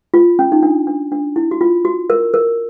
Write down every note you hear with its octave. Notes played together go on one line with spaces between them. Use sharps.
F4
C#4
D#4
D4
D4
D4
E4
F#4
F4
F#4
A#4
A#4